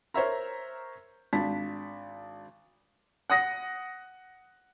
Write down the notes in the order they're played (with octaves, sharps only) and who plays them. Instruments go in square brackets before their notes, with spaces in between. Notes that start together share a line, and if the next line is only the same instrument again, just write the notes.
[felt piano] A#4 C5 C#5 E5 A#5
G#1 D4 A5 B6
[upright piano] F#5 D#6 A#6